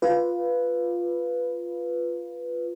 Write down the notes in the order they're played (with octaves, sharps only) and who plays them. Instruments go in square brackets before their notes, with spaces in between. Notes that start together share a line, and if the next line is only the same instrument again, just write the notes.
[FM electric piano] F4 B4